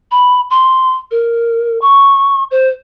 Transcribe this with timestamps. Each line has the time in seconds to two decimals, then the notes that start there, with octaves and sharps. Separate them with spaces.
0.11 B5
0.50 C6
1.11 A#4
1.82 C#6
2.51 C5